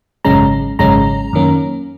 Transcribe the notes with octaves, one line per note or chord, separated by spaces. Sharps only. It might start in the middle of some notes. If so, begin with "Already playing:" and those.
G#1 F#2 C#3 G#3 C#4 A#5
G#1 F#2 C#3 G#3 C#4 A#5
F#2 D#3 A#3 C#4